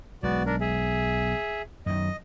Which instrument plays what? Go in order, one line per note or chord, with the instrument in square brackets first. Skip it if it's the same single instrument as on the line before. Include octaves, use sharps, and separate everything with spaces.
[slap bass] B1 G#3 [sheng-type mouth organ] B3 F#4 D5
[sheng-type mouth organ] D4 A#4
G#4 E5
[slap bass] F#2 D#3 [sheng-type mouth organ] D#5